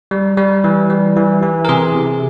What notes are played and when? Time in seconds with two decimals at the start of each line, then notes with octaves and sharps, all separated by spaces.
0.11 G3
0.37 G3
0.64 E3
0.90 G3
1.17 E3
1.42 E3
1.65 A#4
1.69 C3 G#4
1.95 C3